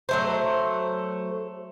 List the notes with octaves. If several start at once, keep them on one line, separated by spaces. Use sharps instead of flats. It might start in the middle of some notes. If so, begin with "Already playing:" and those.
F#3 A3 C5